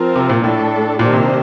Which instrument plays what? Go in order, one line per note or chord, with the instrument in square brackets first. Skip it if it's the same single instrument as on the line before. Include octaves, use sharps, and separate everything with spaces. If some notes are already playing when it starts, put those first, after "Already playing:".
Already playing: [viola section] F3 C4 F4 A#4
[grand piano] C3
A#2
[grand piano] A2 [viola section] A3 D4 A4
[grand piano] A#2 [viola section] D#3 A#3 D4 G4 C5
[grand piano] C3